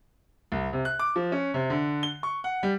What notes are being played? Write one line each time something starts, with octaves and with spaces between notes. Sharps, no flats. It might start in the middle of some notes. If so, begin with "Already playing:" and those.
C2
C3
F#6
D6
F3
C#4
C3
D3
G7
C#6
F#5
G3